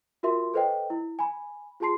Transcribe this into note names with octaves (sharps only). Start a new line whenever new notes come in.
F4 F#4 A#4 E5 C6
A4 B4 C5 D#5 G5
E4
G#5 B5
F4 G4 G#4 A5 C6 C7